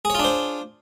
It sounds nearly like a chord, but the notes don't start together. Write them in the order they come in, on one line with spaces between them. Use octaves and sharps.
G#4 C#5 F4 D4 C5